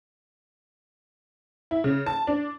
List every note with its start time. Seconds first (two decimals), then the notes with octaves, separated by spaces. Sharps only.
1.71 E4
1.84 C#3
2.06 A5
2.27 D4